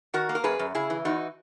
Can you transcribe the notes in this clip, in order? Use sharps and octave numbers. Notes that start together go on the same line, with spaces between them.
D#3 F#4 A#4
A#3
A#4
F#2 G#4 B4
F#2
C#3 E4 G#4
E3
E2 D#4 F#4